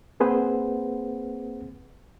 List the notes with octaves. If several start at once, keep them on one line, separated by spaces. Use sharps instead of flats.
A#3 C4 G#4 B4 C5 F#5